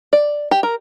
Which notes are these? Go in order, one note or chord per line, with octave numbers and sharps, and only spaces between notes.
D5
G4
A#4